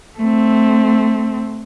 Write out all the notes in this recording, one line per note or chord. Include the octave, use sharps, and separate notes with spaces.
A3 C4